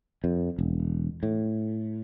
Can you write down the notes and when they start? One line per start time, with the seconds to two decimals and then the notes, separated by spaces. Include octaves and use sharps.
0.24 F2
0.58 E1
1.23 A2